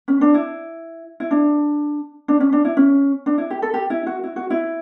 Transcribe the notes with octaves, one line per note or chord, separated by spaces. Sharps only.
C#4
D4
E4
E4
D4
D4
C#4
D4
E4
C#4
D4
E4
G4
A4
G4
E4
F#4
E4
F#4
E4